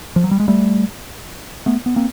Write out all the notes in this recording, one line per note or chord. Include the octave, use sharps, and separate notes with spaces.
F3
F#3
G3
G#3
G3 A3
A3 B3
B3
A#3 C4